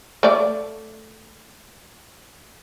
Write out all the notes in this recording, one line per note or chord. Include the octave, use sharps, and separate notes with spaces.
A3 D5